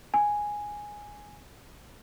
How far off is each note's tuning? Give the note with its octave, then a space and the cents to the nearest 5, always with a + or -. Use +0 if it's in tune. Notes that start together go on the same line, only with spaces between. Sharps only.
G#5 +0